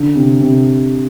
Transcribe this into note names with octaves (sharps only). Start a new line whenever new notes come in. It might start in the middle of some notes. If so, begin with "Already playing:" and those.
Already playing: D3
C3
C3